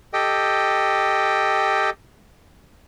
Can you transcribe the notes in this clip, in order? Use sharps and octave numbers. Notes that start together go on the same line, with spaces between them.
G4 A4 D#5 G5